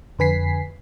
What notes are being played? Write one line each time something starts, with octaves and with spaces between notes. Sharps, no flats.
F2 D3 B4 G#5 B6 C7